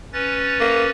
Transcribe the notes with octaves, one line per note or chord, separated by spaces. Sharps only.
C#4 B4 A6
A#3